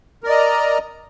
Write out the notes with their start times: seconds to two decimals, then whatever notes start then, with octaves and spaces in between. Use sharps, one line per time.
0.23 A#4
0.26 D5
0.29 D#5
0.32 A#5